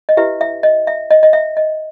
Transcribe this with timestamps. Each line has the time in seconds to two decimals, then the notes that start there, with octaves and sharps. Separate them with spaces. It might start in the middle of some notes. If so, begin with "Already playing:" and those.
0.09 D#5
0.17 E4 G4 B4 E5
0.41 E5
0.63 D#5
0.87 E5
1.10 D#5
1.23 D#5
1.33 E5
1.57 D#5